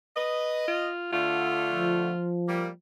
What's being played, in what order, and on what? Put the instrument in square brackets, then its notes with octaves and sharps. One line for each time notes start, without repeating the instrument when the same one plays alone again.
[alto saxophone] B4 [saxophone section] D#5
[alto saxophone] F4
[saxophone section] D3 A3 [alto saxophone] F4
[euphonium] F3
[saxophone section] G3 A#3